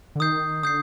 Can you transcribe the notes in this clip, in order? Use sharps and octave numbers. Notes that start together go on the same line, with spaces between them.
D3
D#3 D#6 G6 C7
D3 D#6 G6 C7